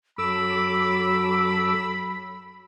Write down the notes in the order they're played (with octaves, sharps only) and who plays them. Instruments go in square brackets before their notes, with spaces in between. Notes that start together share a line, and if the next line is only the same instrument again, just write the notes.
[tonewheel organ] F#2 A4 D6 [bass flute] F#3 [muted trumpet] B5 [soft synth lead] E6